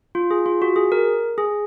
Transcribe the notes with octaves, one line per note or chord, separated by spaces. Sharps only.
F4
G#4
F4
F#4
G#4
A#4
G#4